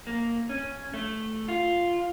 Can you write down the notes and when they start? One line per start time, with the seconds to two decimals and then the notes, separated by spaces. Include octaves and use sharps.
0.07 A#3
0.49 C#4
0.94 A3
1.49 F4